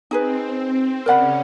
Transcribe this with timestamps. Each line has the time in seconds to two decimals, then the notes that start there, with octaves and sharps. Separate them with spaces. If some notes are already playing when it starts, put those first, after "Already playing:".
0.11 C4 D#4 G#4 B4
1.06 C#3 C#4 A#4 D5 F#5 B5